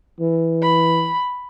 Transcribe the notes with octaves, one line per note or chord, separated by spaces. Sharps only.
E3
B5